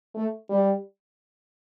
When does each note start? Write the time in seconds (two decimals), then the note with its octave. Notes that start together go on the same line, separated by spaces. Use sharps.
0.15 A3
0.49 G3